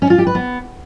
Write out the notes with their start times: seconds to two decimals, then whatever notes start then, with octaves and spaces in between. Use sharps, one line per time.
0.02 C#4
0.10 F4
0.18 G4
0.27 B4
0.35 B3